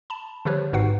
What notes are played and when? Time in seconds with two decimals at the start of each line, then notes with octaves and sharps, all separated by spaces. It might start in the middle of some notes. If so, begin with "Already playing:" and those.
0.10 A5 B5
0.45 D3 F3 G3 G4 B4 C#5
0.73 G#1 G#2 F#4 B4 F#5 C7